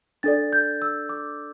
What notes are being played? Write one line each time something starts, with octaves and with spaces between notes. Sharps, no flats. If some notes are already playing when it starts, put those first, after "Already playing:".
D4 A4 D5 A6
G6
E6
D6